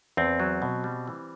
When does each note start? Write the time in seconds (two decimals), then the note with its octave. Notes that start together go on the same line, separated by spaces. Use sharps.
0.17 E2 C4
0.40 F#3
0.62 B2
0.84 G3
1.08 E3